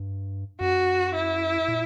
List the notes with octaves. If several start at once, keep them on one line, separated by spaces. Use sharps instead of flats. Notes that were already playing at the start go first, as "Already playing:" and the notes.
Already playing: G2
F#2 F#4
E4
A#2